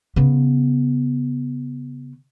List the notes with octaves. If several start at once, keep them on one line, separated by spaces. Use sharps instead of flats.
C#3 B3